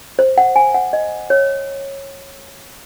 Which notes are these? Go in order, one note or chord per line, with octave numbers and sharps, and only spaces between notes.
C5
F#5
G#5
F#5
D#5
C#5